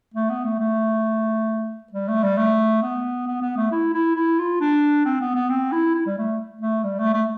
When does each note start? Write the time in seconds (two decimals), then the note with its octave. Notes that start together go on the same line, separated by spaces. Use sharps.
0.14 A3
0.30 B3
0.44 A3
0.59 A3
1.92 G3
2.08 A3
2.23 G3
2.37 A3
2.82 B3
3.27 B3
3.42 B3
3.57 A3
3.72 E4
3.94 E4
4.16 E4
4.39 F4
4.61 D4
5.05 C4
5.21 B3
5.35 B3
5.49 C4
5.72 E4
5.95 E4
6.06 G3
6.17 A3
6.61 A3
6.84 G3
6.99 A3
7.14 A3